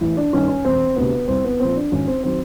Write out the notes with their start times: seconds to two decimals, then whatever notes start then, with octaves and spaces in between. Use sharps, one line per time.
0.01 A1 E4
0.17 D4
0.33 G2 D#3 C#4
0.48 C#4
0.65 E1 C4
0.96 D2 C3 B3
1.28 C2 C4
1.44 B3
1.60 A#2 F3 C4
1.76 D4
1.92 G#1 C#4
2.07 C4
2.23 D#3 F#3 C4